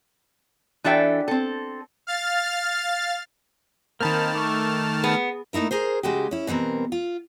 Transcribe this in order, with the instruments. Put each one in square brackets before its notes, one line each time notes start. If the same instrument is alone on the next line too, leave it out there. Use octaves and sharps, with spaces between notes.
[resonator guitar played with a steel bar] E3 D4 F#4 A4 E5 G5
C4 A4
[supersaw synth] F5 F6 A6
[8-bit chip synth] D#3 A5 F6 [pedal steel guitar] A#3 C4 D#4 [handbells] A#4 B5
[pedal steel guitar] A3 [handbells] C#6 D6
[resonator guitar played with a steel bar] B3 [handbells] G#4
[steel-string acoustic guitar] A3 A#3 D#4 E4 A#4
G#4 A#4 C5
C#3 G#3 F#4 G4
C#4 E4
B2 E3 G3 C4 A#4
F4